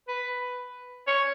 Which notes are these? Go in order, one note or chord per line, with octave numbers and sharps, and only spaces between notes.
B4
C#5